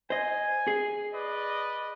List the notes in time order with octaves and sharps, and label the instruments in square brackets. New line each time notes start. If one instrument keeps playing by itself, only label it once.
[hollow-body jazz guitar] C5 D#5 [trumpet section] G#5
[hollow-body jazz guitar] G#4
[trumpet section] B4 D5 D#5